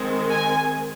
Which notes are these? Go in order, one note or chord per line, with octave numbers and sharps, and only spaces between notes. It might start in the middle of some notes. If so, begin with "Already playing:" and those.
Already playing: D#3 G#3 C4
G#5